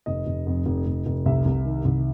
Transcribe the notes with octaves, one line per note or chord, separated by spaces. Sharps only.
F1 D#5
F1
F2
F1
F1
F1
C2 E5
C2
D#3
C2